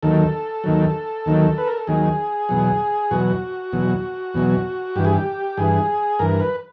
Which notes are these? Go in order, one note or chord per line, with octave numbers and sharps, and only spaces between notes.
D#2 D#3 F#3 A4
D#2 D#3 F#3
D#2 D#3 F#3
B4
A#4
A4
D#2 D#3 F#3 G#4
E2 B2 F#3
E2 B2 F#3 F#4
E2 B2 F#3
E2 B2 F#3
G2 E3 G4
G#4
G4
G2 E3 G#4
G2 E3 A#4
B4